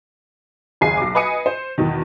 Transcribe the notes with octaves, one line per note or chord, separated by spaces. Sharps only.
F#1 D#2 G#4 G#5 C7
B1 D6
B4 D#5 G#5 D#6 C#7 D#7
C5
E2 B2 D#3